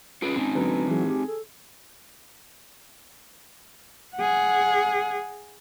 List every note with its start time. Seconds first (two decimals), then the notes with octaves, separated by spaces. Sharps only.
0.22 C#4 F4 G#4 B4 D7
0.36 C4 D#4
0.55 D3 F#3 B3
0.88 E3 F#3 G#4
1.07 G4 G#4
1.27 A4
4.16 G#4 F#5